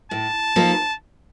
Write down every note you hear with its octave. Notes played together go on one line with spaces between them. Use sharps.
A2 A5
F3 A#3 D#4 A4